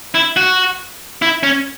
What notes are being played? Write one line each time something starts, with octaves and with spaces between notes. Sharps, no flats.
E4
F#4
E4
C#4